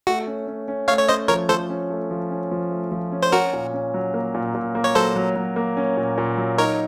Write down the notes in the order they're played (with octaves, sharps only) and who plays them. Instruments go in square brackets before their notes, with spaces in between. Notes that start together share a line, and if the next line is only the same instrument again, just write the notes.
[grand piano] A3 [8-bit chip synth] F#4
[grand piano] C#4
C#4
C#4
[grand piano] A3 [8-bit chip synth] C#5 F5
[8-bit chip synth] C#5
[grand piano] C#4 [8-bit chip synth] C5 D#5
[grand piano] F3 [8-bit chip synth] A#4 C#5
[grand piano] F3 [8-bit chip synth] A4 C5
[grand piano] C#4
A3
F3
C#4
F3
A3
F3
C#4
[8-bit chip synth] C5
[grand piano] C#4 [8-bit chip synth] F#4 A#4
[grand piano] A#2
C#4
F#3
A#3
A#2
A#2
A#3
[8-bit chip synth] C#5
[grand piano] F#3 [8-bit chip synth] A4 C5
[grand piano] F#3
F#3
A#3
C#4
A#2
A#2
F#3
[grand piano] D#4 [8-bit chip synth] A#4 C#5